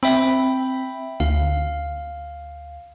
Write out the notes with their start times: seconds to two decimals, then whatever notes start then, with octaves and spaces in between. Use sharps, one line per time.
0.03 C4 E5 G5 B5
1.20 D2 F5